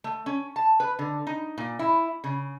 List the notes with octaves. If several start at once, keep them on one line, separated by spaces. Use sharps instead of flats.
A3
C#4
A5
B4
D3
D#4
A#2
E4
C#3